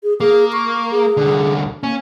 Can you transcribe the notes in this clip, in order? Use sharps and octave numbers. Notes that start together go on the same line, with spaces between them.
G#4
A#3 G#4
C#6
G#4
C2 D3
A#3 C#4